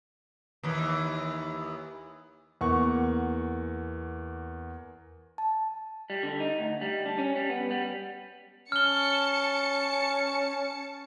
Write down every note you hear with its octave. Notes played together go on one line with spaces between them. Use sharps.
D#2 E3
E2 A#3 F#5 C#6
A5
G3
D3
D#4
D2
G3
D4
C#4
G3
B3
G3
C#4 A5 F6 C#7 G7